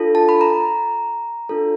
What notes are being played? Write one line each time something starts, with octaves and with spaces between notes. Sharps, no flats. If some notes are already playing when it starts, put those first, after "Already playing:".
Already playing: D4 F4 A4
A5
B5
A#5
D4 F4 A4